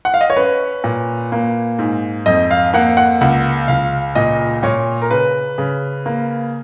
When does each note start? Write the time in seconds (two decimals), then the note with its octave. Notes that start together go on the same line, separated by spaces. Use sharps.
0.05 F#5
0.14 F5
0.21 D#5
0.30 C#5
0.36 C#4 B4
0.84 A#2
1.32 A#3
1.79 G#2
2.26 F2 D#5
2.51 F5
2.74 A#3 F#5
2.97 F#5
3.21 C#2 F#5
3.68 C#2 F5
4.15 A#2 D#5
4.63 A#2 C#5
5.02 A#4
5.10 C#3 B4
5.58 C#3
6.06 A#3